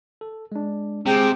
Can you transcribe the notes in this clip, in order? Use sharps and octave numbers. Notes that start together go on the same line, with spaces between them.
A4
G#3 D4
C3 G#3 G#4 G5